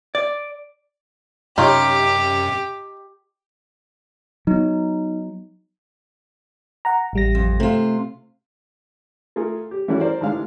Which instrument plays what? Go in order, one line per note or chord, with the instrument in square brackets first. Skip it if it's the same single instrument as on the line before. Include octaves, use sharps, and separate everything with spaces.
[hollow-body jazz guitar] D5
[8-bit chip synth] F#2 C3 [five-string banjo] D#4 F4 C#5 [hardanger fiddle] G4
[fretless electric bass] F#3 B3 [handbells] D#4
[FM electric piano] F#5 A#5
A1 G3 A#6
[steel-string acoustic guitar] F2
[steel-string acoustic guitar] C3 F4 [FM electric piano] A3
[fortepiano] A3 F4 G#4 A#4
G4
E3 G3 A3 C#4 E4 F#4
A#4 C5 D5
A1 G#2 D3 G#3 D4 F5